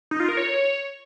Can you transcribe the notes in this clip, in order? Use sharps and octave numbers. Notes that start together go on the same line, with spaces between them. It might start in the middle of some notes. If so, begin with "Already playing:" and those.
D#4
F4
A#4
C#5